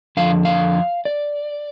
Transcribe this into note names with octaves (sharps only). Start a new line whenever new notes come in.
F2 D3 F3 F5
F5
D5